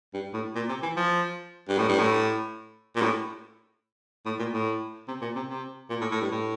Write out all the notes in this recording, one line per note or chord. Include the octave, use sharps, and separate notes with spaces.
G2
A2
A#2
C3
E3
F3
G2
A2
G2
A2
A#2
A2
A2
A#2
A2
C3
A#2
C3
C3
A#2
A2
A2
G2
A2